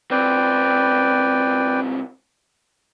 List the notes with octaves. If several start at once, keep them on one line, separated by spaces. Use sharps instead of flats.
C#2 C4 B4 D5 G5